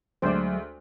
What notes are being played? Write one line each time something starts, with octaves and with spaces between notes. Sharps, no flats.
D2 F#3 G#3 C5 D5